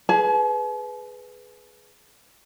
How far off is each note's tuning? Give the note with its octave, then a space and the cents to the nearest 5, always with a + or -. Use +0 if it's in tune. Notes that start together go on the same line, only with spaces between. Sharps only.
G#4 +10 B4 +5 A5 -45